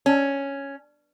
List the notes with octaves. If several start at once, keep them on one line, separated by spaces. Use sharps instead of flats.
C#4